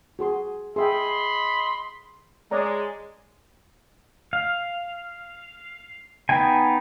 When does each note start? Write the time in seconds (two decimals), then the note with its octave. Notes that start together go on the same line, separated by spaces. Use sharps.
0.19 F#4 G#4 C6
0.76 G#4 D#5 E5 G5 B5 C6
2.51 G#3 C#5 D5 A#5
4.33 F5
6.29 B3 D#4 G5 G#5